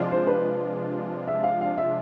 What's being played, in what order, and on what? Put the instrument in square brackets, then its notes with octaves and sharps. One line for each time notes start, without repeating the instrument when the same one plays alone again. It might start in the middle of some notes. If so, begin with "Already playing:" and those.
Already playing: [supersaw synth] C3 F3 G#3 D4 F4
[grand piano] C5
B4
E5
F5
F5
E5